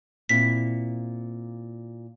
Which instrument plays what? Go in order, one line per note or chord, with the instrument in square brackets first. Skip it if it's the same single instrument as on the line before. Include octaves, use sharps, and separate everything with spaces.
[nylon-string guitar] A#2 C4 E4 [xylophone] B6